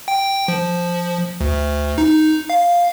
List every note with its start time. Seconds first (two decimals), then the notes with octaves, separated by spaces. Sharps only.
0.08 G5
0.48 F3
1.41 D2
1.98 D#4
2.50 F5